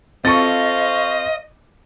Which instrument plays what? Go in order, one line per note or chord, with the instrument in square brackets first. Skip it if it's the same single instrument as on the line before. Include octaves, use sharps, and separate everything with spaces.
[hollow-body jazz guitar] C4 F4 A4 [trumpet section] C5 F5 [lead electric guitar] D#5 [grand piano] C#6 A6